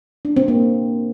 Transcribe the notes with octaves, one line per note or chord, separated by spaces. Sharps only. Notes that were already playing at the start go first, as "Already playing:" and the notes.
D4
C4
A#3